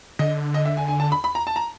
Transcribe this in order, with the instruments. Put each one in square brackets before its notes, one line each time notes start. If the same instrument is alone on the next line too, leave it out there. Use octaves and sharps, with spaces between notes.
[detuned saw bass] D3 [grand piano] D#5
[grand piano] D#5
E5
G#5
G#5
A5
B5
B5
A#5
A5
A#5